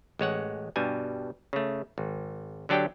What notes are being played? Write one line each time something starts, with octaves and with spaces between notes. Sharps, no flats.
A1 G#3 C#5 F#5
G2 B2 G3 G#5
C#3 A3
G#1
D3 F#3 D4 G4 G5